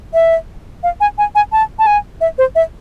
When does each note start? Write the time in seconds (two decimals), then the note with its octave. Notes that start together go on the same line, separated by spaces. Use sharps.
0.14 E5
0.83 F5
1.01 G#5
1.18 G#5
1.35 G#5
1.52 A5
1.79 A5
1.87 G#5
2.21 E5
2.38 C5
2.55 E5